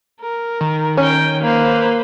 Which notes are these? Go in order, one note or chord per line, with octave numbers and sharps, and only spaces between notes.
A#4
D#3
C#4 A#4 G5
A#3 B4 C5